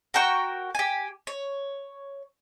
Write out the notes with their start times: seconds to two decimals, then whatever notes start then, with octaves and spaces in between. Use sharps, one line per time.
0.14 F#4 A#4 G5 C#6
0.75 G4 G#5
1.27 C#5